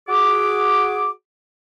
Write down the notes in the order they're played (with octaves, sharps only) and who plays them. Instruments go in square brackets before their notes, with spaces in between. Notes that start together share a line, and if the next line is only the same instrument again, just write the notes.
[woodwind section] F#4 G#4 D6